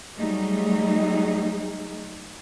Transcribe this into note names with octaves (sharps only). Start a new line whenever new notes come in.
F#3 G3 A3 D#4 G#4